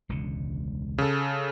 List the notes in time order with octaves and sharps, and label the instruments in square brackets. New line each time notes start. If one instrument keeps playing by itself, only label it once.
[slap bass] E1 C#2 D3
[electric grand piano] C#3 A4